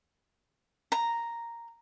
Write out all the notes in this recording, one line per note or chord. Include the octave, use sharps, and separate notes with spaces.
A#5